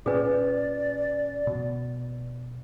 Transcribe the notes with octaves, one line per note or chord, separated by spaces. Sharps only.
A#2 C#4 G#4 B4 D5
B2